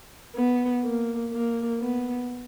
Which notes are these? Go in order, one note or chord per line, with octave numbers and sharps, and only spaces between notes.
B3
A#3
A#3
B3